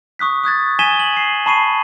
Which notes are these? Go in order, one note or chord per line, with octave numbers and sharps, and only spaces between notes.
C#6 D#6 F#6 B6
D#6 F#6 G#6 A6
G#5 G#6 B6 D#7 E7 G7
F#7
C7
A5 B5 C#6 C7 D#7